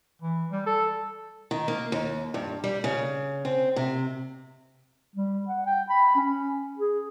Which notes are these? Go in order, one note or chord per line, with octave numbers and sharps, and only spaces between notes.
E3
G3
A4
D#3
A#3
D#2
G2
G3
C#3
C4
C3
G3
F#5
G5
B5
C#4
G#4